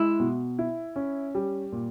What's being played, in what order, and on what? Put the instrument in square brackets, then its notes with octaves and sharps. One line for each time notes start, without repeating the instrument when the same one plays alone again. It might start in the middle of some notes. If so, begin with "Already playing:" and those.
Already playing: [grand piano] G#3 [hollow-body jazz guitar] E4
[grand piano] B2
E4
C#4
G3
A#2